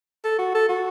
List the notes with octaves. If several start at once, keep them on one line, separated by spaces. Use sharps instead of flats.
A4
F#4
A4
F#4